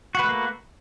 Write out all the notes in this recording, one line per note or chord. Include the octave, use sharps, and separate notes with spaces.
A3 A#3 F#4 B4